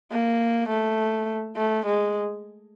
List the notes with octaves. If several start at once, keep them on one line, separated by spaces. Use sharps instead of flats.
A#3
A3
A3
G#3